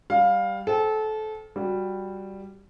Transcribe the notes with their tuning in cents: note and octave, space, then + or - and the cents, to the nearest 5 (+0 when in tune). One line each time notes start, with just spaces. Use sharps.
G3 +0 F5 +15
A4 -25 C5 +0 G5 +0
G3 +0 F#4 -10